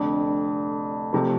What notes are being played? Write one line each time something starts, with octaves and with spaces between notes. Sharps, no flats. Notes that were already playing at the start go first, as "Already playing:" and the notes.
Already playing: F1 F2 D3
C3 F3 A3